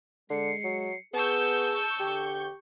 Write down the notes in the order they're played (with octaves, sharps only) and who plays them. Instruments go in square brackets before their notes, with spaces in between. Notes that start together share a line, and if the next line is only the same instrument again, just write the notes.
[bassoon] D3 [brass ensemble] G#3 [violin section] C7 C#7
[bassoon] F#3
[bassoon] B3 [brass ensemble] G#4 [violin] A5 E6 [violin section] C#6 G6
[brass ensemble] E2 D3 [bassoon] G4